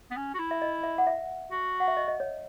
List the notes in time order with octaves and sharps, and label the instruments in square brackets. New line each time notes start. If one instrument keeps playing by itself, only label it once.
[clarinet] B3
C#4
F#4
E4
[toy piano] E5
D#5
E5
F#5
E5
[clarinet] F#4
[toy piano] F#5
E5
D#5
D#5
C#5